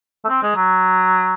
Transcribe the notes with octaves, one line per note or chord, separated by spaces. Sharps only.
A3
C4
G#3
F#3